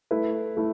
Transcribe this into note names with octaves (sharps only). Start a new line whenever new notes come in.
A3 E4 B4
A3 E4